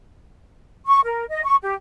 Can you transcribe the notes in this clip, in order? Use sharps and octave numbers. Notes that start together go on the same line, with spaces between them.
C#6
A#4
D#5
C#6
G4